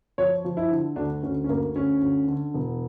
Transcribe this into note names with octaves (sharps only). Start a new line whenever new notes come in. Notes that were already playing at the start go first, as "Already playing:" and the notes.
F3 C#5
F3
E4
D3
D2 D4
D2 C#4
C#4
D2 A#3
D2 C#4
D2
D3
E1